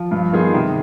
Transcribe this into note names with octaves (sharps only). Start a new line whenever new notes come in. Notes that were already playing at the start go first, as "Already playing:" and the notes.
Already playing: F3
G2
D#3 B3 F4 G#4
C3 D#3